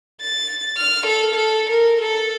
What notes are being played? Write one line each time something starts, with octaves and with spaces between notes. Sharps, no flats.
A6
F6
A4
A4
A#4
A4